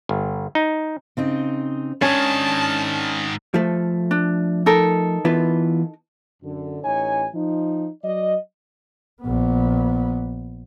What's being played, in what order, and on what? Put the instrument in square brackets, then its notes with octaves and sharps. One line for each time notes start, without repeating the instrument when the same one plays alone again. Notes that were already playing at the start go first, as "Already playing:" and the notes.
[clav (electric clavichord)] G1
D#4
[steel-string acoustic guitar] C#3 C4 D#4
[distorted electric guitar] G#2 D#3 [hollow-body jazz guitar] C#4 [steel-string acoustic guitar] D4 [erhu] A5
[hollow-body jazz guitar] F3 A3
[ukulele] D4
D#4 A4 A#4
[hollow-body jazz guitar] E3 B3 F4
[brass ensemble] F#2 D3
A1 D#4 C#5 G#5
F3 D#4
F#3 D5 D#5
[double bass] A#1 B3